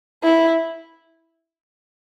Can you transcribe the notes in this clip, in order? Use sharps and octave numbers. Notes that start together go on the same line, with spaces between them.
E4